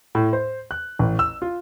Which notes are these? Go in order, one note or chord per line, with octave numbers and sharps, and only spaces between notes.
A2
C5
F#6
A1
E6
F4